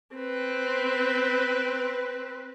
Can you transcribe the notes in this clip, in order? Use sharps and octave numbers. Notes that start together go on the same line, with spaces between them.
C4 B4